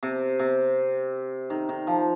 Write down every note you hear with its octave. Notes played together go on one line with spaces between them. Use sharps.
C3
C3
D#3
D#3
F3